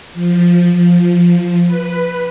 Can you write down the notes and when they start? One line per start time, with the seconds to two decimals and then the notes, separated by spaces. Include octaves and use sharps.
0.14 F3
0.73 F3
1.67 B4